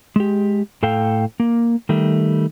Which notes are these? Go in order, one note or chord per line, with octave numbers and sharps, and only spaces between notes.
G#3 G4
A2 A4 F5 G5
A#3
D#3 G3 A3